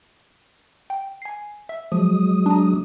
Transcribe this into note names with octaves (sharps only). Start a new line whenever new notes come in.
G5
G#5 C7
E5
F3 F#3 G#3 D#6
D4 A#5